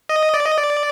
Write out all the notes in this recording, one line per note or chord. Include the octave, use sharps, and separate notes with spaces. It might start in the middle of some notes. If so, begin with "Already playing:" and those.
D#5
D5
D#5
D5